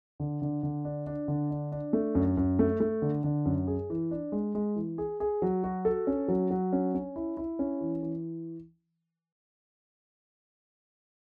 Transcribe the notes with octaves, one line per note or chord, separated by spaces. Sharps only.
D3
D3
D3
D4
D4
D3
D4
D4
A3
F#2
F#2
A3
A3
D3
D3
F#2
G#4
E3
D4
G#3
G#3
E3
G#4
G#4
F#3
F#4
A4
C#4
F#3
F#3
C#4
C#4
E4
E4
C#4
E3
E3